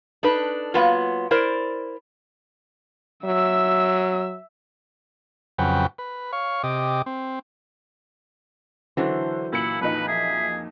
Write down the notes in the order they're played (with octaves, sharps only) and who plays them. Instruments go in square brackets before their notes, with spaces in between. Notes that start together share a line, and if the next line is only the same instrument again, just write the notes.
[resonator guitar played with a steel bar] D4 D#4 A4 B4
F#3 A#3 B3 F4
E4 A#4 C5 D5
[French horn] F#3 [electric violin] E5 E6
[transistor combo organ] F2 C#3 F#3 B4 F#5 G5
B4
C#5 F5 C#6
C3 G4 D#5 D6
C4
[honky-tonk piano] D3 [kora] E3 F#3 D4 [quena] C5
[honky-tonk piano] A#2 C#7 F#7 [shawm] E4
[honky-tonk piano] F2 A#2 D#4 [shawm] B4 [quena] B5
[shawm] G#4 [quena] E5